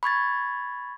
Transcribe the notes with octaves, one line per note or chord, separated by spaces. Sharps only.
B5 C#6 G#6 A6